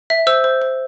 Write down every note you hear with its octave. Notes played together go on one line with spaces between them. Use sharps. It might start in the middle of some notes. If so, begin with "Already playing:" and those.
E5
C5 E6
C5
C5